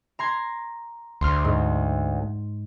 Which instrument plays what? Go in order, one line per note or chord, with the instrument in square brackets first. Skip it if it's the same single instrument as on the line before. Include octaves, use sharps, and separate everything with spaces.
[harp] A#5 C6 G#6
[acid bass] D2 [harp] C6 F6
[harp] G#2